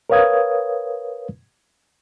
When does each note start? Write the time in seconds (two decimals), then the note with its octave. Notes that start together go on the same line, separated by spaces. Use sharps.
0.10 A#4 B4 C#5 F5 D#6 G#6